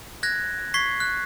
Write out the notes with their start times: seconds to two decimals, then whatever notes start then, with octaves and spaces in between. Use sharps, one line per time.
0.23 F#6 G#6 A#6
0.74 C#6 G#6 B6 C7
1.00 F#6